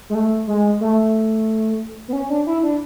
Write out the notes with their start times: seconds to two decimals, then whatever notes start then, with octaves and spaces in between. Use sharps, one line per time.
0.10 G#3
0.15 A3
0.47 G#3
0.81 A3
2.08 B3
2.13 C#4
2.30 D4
2.47 E4
2.63 D4